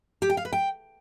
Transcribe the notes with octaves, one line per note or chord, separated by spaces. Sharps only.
G4
G5
F5
B4
G5